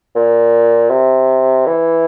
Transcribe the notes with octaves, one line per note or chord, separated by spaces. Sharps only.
A#2
C3
E3